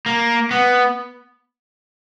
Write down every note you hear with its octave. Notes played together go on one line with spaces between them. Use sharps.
A#3
B3